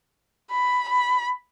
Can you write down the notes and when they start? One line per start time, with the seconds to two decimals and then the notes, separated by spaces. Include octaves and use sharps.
0.51 B5
0.89 B5